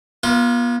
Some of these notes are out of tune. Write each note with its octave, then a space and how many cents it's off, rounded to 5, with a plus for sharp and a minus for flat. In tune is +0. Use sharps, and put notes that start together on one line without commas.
B3 -40 F4 +0